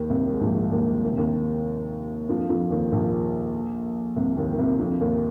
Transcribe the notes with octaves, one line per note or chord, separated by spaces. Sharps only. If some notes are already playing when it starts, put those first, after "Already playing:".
Already playing: D#2 D#3
C2 C3
G#2
A#1 A#2
D#2 D#3
D#3
C3
D#2 D#3
F2 F3
F2 F3
D#2 D#3
A#1 A#2
C2 C3
D#2 D#3
D#3
C2 C3
F2 F3
D#2 D#3